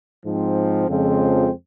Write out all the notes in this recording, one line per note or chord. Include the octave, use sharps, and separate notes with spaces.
G#2 F3 C4
F2 C#3 F3 G#3 C4